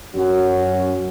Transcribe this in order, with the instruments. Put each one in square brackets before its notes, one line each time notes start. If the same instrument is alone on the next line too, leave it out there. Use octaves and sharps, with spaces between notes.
[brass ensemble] F#2 C#4 F#4